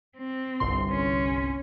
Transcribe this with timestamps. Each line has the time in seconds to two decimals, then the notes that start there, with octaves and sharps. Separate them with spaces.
0.18 C4
0.60 G1 C2 C6
0.91 C#4